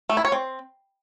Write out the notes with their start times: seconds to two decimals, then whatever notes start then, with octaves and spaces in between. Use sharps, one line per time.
0.09 A3
0.17 E4
0.25 C#5
0.32 C4